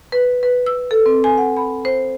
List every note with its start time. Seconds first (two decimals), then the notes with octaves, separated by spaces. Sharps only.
0.12 B4
0.43 B4
0.66 E6
0.91 A4
1.06 C4
1.24 G#5
1.38 F#5
1.57 B5
1.85 C5